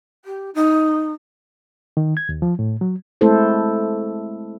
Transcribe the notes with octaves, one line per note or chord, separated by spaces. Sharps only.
G4
D#4
D#3
G#6
D#2
F3
A2
F#3
G#3 A3 C4 E4 A4 C5